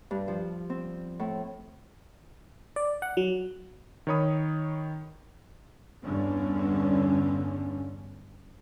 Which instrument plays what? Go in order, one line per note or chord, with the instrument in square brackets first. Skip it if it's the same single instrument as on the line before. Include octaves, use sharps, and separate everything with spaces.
[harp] G2
F3
C4
A2
[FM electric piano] D5
F#5
F#3
[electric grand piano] D#3 D#4 C#5 B5 D#6
[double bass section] E2 G2 D3 C#4